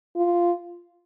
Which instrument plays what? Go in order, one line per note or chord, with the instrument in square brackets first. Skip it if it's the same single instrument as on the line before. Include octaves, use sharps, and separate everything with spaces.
[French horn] F4